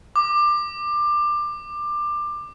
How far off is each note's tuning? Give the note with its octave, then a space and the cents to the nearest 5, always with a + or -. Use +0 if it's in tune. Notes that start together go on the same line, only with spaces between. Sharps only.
D6 +20